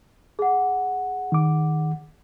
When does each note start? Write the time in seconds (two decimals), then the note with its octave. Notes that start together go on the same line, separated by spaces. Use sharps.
0.39 G#4 F#5
1.32 D#3 D6